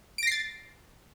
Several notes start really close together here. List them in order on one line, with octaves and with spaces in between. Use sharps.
D7 A#6 C7 A6